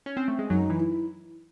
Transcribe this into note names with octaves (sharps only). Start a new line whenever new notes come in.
C#4
C4
A3
G#3
F#2 F#3 D#4
E3
E4